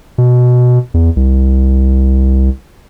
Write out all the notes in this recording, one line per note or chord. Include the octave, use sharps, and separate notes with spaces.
B2
E2
C2